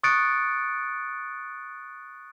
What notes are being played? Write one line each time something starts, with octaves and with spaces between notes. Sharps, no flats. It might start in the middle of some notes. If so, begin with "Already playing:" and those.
C#6 D#6 F#6 A6 C#7 D7